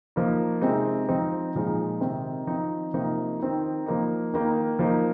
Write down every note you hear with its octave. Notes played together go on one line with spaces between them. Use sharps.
F3 A#3 D#4
C3 G#3 C4 D#4
F3 C4 D#4
A#2 F3 G#3 D#4
C3 D#3 C4 D#4
F3 C4 D#4
C3 F3 A#3 D#4
D#3 C4 D#4
F3 A#3 D#4
D#3 A#3 D#4
F3 A#3 D#4